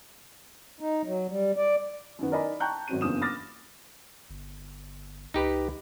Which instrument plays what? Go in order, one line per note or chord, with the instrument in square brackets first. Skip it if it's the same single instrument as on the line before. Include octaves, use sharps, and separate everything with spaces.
[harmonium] D#4
F#3
G3
D5
[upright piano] F#2 D#3 B3
D#4 A#4 D5 D#5 G#5 B5
G5 A5 A#5 C#6 F#6 G6
G#1 F#3 C4 D#7
F#1 E2 G2 F4 D#6 E7
B5 D6 D#6 F6 A6 A#6
[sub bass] G1
[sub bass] C#2 [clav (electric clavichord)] D#4 G4 B4